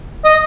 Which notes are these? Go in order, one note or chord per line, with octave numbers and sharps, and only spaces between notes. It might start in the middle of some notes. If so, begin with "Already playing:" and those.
D#5